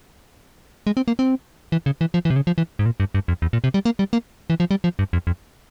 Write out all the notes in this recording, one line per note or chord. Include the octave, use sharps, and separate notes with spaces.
G#3
C4
A#3
C4
E3
C#3
E3
F3
E3
C3
C#3
F3
E3
G#2
A#2
G2
G2
F2
E2
A#2
C3
G3
A#3
G3
A#3
E3
F3
G3
F3
G2
F2
F2